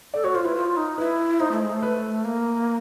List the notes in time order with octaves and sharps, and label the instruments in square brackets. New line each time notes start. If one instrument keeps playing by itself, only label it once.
[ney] A4 [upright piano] D5
[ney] F#4 [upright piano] C#5
[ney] F4 [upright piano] C5
[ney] E4 [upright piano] B4
[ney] F4
D#4
[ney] E4 [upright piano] B4
[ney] D#4 [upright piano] C5
[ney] A3
G#3
[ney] A3 [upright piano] C5
[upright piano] B4
[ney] A#3